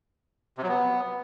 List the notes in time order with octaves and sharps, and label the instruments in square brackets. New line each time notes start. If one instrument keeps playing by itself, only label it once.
[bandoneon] C3
F#3
B3